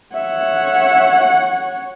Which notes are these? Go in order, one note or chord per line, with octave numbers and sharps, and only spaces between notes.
C#5 E5 F#5